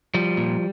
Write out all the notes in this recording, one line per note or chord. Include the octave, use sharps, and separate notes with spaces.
F3 G3
A#2